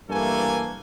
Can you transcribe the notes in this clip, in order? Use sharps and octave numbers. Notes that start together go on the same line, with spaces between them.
G2 E3 A3 A#3 A4 G#5